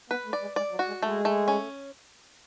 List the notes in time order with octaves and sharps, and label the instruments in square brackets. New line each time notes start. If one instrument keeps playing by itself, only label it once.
[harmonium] B3 [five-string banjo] B4
[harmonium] A3
[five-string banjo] D5
[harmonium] G#3
[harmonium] G#3 [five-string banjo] D5
[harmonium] F#3
[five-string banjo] F#4
[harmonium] G#3
[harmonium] G#3 [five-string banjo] A3
[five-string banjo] A3
C#4